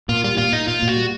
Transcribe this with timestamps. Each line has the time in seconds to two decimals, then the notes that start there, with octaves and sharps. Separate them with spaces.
0.09 A#2 F4
0.24 G3 F4
0.38 A#2 F4
0.53 A#2 D#4
0.68 A#2 F4
0.82 A#2
0.88 F#4
0.96 G3